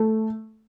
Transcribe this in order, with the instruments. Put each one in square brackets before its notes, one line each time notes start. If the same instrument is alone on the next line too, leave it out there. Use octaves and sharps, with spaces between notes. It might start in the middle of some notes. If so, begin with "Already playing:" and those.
Already playing: [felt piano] A3